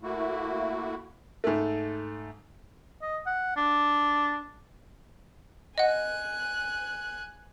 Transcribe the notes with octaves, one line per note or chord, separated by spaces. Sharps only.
A3 A#3 E4 F#4
G#2 A3
D#5
F#5
D4
D#5 F#5 G#5 F#6